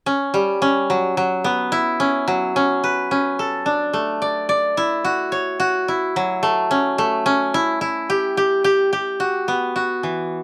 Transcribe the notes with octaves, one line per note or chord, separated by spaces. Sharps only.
C#4
G3
C#4
F#3
F#3
B3
E4
C#4
F#3
C#4
B4
C#4
A4
D4
A3
D5
D5
E4
F#4
C#5
F#4
E4
F#3
A3
C#4
A3
C#4
E4
E4
G4
G4
G4
G4
F#4
B3
F#4
E3